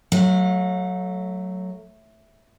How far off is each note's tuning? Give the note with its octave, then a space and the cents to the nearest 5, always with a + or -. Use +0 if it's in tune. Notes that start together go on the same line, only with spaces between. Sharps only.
F#3 +0 A3 +0 F#5 -45